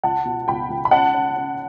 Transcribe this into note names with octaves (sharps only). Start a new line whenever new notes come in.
C#2 F#5 A5
B2
C#2 G5 B5
C#2
B5
C#4 F#5 A5
C#4
C#4